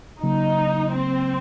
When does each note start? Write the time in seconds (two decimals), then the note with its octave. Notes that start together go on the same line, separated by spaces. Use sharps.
0.22 C#3 F#3 A#3 D#4
0.94 C4